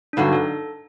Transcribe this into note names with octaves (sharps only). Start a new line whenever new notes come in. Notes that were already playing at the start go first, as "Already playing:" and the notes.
D4
G2 D3 F#3 D#4
A4